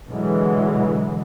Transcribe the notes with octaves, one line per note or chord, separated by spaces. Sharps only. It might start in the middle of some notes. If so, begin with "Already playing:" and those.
B2 D3 E3 F#3 G#3